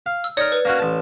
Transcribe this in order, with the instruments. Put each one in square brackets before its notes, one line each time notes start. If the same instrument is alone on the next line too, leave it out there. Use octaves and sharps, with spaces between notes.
[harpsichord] F5
[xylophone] E6
[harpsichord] D#4 A#4 [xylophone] C#5 D5 C#7
[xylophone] B4
[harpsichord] A#3 C#4 F#4
A1 A5